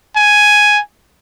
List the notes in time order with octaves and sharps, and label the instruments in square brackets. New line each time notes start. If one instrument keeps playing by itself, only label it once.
[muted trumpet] G#5